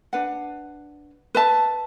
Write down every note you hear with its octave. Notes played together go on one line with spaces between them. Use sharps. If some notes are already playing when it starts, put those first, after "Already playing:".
D4 B4 F#5
B4 E5 A5